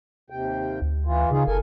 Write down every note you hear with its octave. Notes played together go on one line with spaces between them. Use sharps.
D#2 C3 G5
D2
E3 F4
C#3 D#4 F4 G#4
F#1 A4 A#4 G#5